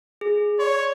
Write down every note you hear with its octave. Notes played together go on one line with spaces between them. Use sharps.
G#4
C#5 D5 C6